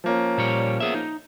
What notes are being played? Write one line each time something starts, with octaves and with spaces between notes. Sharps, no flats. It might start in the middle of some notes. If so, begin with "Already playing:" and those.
F3 A#3 C#4
A#2 G3 C#5
B3 G#4 E5
D#4